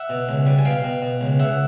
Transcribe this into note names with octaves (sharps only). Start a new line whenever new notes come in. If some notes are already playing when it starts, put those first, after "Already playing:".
Already playing: E5 F#5
B2
C#2
G3
G#5
B2 F5 G5
B2
B2
C#2
C#2 E5 F#5